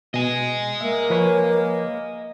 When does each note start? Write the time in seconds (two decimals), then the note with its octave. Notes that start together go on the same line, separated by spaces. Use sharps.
0.14 B2 D#5 G#5
0.81 A#3 E5
1.10 F3 B4 C#5